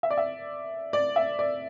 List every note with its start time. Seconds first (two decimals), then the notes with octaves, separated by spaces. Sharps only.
0.03 E5
0.10 D5
0.18 E5
0.93 D5
1.16 E5
1.39 D5